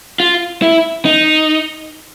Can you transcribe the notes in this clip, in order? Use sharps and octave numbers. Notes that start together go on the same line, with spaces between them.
F4
E4
D#4